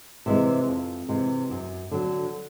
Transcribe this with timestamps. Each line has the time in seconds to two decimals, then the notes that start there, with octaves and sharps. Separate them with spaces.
0.26 C3 E3 G#3
0.68 F2
1.09 C3 E3 G#3
1.50 F#2
1.91 D3 F#3